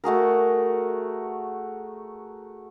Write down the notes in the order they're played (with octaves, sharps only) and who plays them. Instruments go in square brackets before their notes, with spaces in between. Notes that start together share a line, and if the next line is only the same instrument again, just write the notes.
[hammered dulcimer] A3 F#4 G#4 A#4